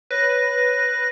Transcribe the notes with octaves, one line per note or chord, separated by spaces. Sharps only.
B4 C#5 A#6